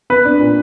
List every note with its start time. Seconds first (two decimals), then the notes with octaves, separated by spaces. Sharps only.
0.10 B3 B4
0.25 D4
0.40 A#2